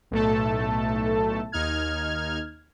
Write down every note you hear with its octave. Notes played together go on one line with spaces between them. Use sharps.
B1 A2 A3 A4 A5
D#2 D#4 F6 G#6